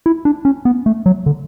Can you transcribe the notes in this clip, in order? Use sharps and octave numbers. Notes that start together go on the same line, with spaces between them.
E4
D4
C#4
B3
A3
F#3
D3